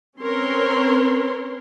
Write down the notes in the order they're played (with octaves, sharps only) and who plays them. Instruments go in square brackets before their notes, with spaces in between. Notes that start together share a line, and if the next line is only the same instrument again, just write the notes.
[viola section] C4 C#4 A#4 B4 C#5 C6